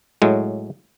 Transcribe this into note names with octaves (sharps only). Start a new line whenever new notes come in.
A2 F#3 G#3